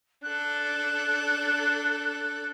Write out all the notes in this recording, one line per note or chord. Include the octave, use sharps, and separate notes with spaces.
D4 A4 F#6